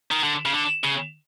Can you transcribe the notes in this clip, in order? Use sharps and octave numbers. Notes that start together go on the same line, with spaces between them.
D#3
D3
C#3
D3
C#3